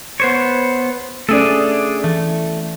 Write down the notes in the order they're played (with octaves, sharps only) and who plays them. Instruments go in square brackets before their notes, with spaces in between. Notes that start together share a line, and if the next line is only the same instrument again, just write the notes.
[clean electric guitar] B3 C5 C#5
[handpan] A3 C#4 D5 [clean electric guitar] D4 G#4 A4
[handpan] E3 [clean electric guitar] A3